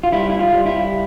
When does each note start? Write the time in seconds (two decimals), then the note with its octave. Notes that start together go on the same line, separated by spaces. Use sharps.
0.03 F4
0.12 G3 E4
0.30 E4
0.39 F4
0.53 G3
0.66 E4